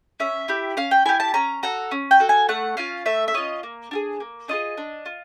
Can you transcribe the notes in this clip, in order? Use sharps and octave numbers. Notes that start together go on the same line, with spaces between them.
C#4 E5
E4 G4
C#4 F5
G5
E4 G4 G#5
A5
C#4 A#5
F#4 A4 A#5
C#4
G5
F#4 A4
G#5
A3 F#5
C#4 F4 F5
A3 E5
E5
C#4 F4 D#5
A#3
D4 F4 G#4
A#3
D4 F4 G#4 D#5
D4
F4